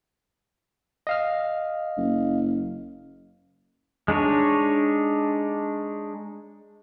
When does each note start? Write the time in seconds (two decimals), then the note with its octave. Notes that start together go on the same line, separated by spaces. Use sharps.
1.07 D#5 F5 F6
1.97 F#1
4.08 G#3 D4 D#4 C#5